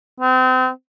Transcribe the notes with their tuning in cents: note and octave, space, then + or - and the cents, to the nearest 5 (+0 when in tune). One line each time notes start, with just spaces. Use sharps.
C4 -35